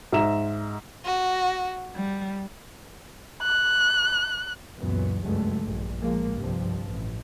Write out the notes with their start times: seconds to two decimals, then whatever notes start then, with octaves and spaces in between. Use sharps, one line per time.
0.12 G#2 E5 A#5 E7
1.06 F#4
1.95 G3
3.43 F#6
4.79 C#2 F#2 A#2 E3 F#3 B3
5.23 F#1 C#2 G2 F#3 G#3 A3
5.63 A#1 G2 A#2
6.00 A2 F3 G#3 A#3
6.31 C2 G2 C3 F3
6.86 A1